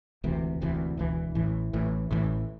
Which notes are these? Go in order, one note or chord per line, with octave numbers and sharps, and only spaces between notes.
E1 D2 C3 E3
E1 D2 C3 E3
E1 D2 C3 E3
A1 A2 E3
A1 A2 E3
A1 A2 E3